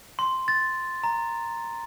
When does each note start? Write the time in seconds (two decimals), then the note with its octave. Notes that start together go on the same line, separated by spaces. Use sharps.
0.19 C6
0.48 A6
1.04 A#5